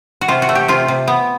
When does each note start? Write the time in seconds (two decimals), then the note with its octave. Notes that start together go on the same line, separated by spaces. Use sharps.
0.21 F#4
0.28 C3 F4
0.42 F#4
0.49 A3
0.55 G4
0.68 C3 F4
0.88 C3
1.07 B3